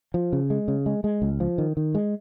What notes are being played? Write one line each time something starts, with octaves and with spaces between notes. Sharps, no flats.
F3
C#3
G#3
C#3
G#3
G#3
C#2
F3
D#3
D#3
G#3